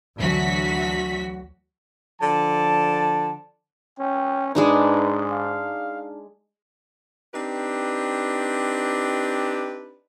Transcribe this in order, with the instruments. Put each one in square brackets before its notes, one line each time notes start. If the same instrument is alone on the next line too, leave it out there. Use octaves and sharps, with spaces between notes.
[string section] D2 E3 F#3 F#4 B6
[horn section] D3 F3 A5
[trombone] C#4 [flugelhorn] G5
[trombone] G#2 [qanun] G#3 D4 D#4 [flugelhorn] B4
[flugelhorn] F5
[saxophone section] C4 D4 D#4 G4 B4